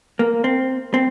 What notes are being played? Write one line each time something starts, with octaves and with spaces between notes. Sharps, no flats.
A#3
C4
C4